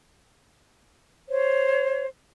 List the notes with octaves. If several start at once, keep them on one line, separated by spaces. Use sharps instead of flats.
C5 C#5